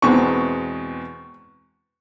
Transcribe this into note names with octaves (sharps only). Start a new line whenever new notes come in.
E2 B2 G#3 C4 C#6